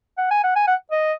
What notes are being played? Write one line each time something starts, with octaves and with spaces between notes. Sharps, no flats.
F#5
G#5
F#5
G#5
F#5
D#5